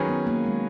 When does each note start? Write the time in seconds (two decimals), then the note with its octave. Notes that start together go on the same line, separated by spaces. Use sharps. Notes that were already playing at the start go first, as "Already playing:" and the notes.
Already playing: D#3 F#3 C#4 G#4 B4
0.09 B3
0.27 A#3
0.45 G#3